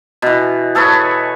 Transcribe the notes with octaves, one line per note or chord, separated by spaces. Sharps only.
B2 E3
G#4 A4 B4 C#5